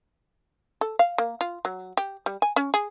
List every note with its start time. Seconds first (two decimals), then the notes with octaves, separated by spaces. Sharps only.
0.81 A4
0.99 F5
1.18 A#3
1.41 F4
1.65 F#3
1.97 G4
2.26 G3
2.42 G#5
2.56 C#4
2.74 G#4